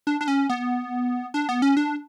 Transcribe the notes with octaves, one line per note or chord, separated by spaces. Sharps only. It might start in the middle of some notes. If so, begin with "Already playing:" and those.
D4
D4
C#4
B3
D4
B3
C#4
D4